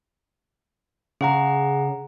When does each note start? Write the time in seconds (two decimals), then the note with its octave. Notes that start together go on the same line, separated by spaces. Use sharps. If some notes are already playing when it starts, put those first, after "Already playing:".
1.21 C#3 G#4 F#5 A#5